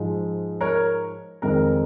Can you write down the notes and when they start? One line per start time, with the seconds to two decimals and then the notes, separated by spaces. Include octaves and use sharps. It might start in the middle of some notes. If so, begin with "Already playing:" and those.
Already playing: G#2 F3 G#3
0.61 A#4 C#5
1.42 F2 D#3 G#3 A#4